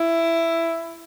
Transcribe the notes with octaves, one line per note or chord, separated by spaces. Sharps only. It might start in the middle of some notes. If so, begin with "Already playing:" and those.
Already playing: E4